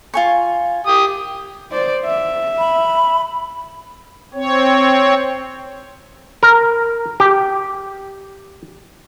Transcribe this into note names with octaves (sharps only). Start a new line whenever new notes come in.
F4 G#5 C#6
G4 D#6
C5 D5
E5
B5
C4 C#5
A#4
G4